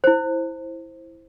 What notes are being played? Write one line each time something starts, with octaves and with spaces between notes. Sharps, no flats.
E4 C5